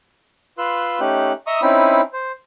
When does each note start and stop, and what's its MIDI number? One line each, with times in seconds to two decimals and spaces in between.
0.58 1.00 65
0.58 1.00 71
0.58 1.00 84
0.58 1.00 88
0.58 1.00 90
1.00 1.32 57
1.00 1.32 61
1.00 1.32 63
1.00 1.32 67
1.00 1.32 90
1.47 1.61 75
1.47 1.61 76
1.47 1.61 82
1.47 1.61 85
1.47 1.61 87
1.62 2.01 60
1.62 2.01 61
1.62 2.01 63
1.62 2.01 64
1.62 2.01 83
2.13 2.32 72